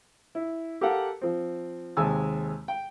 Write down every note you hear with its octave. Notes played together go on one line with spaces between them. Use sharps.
E4
G4 A4 A#4 F5 F#5
F3 C4
D#2 C3 G#3 G#5 A5 E6
G5